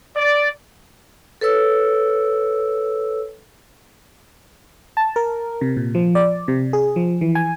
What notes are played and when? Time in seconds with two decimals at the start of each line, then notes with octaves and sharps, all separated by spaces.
0.16 D5
1.41 A4 B4 C#5 E6
4.97 A5
5.16 A#4
5.61 C3
5.77 A#2
5.95 F3
6.15 D5
6.48 C3
6.73 G#4
6.96 F3
7.21 E3
7.35 G#5